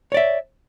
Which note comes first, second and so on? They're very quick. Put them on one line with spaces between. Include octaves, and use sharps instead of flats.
C#5 D5 E5